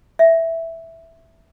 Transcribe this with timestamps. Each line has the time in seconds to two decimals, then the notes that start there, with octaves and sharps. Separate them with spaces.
0.19 E5